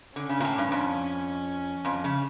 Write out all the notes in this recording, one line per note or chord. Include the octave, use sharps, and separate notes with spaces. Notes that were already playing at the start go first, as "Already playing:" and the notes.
D3 C#4
C#3
A#2
A2
G2
F2
F2
C#3